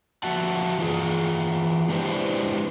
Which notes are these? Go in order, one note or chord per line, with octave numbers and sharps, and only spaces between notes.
F3 F#4 E5 F#5 A5
E3 F4 G#4
G#3 D4 E4 G4 B4 C5